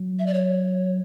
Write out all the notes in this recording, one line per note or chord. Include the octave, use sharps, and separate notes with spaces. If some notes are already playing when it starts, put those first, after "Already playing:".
Already playing: F#3
E5
D5
C#5